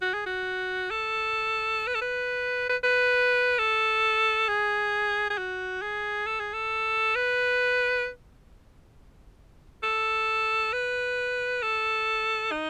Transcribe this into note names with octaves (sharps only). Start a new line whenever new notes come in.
F#4
G#4
F#4
A4
B4
A4
B4
B4
B4
A4
G#4
G#4
F#4
G#4
A4
G#4
A4
B4
A4
B4
A4
D#4